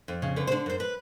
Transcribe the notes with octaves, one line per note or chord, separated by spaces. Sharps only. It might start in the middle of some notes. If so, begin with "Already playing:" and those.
F2
C#3
D3 B4
C5
D3
F#2 C5
B4